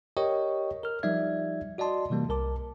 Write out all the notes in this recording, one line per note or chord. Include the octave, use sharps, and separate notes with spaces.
G4 A#4 C#5 D#5 G5 C#6
A#4 F6
F3 G3 D#4 D5 E5 G#6
F#4 D5 D#5 A5 C6
C3 E3 G3 A#3
C2 A#4 A5 D6